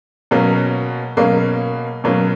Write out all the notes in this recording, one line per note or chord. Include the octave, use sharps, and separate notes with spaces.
B2 F#3 A#3 C#4
B2 F#3 A#3 C#4
B2 F#3 A#3 C#4